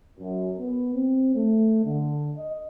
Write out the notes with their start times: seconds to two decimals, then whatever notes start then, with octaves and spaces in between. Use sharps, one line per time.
0.18 F#2
0.59 B3
0.95 C4
1.34 A3
1.85 D3
2.37 D#5